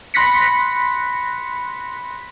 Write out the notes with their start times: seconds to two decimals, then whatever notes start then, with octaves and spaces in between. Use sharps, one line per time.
0.14 B5 C6 F#6 A#6 B6 C#7